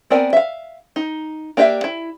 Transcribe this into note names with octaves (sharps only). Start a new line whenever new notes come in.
B3 C4 A#4 D5 G#5
E5 F5
D#4
A#3 D4 G4 E5 F5
E4